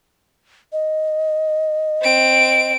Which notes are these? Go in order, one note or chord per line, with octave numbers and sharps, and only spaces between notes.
D#5
C4 D7